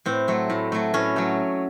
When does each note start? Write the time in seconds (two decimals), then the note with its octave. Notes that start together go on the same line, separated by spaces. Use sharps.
0.06 A2 C4
0.28 F#3 A3
0.50 A2
0.72 F#3 A3
0.94 A2 C#4
1.16 F#3 A3